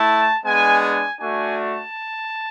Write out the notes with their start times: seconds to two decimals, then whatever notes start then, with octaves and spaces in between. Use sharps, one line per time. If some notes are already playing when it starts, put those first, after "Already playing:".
Already playing: A3 E4 A5
0.45 G#3 B3 D4 G#5
0.82 G#5
1.20 A3 D4 F#4 G#5
1.59 A5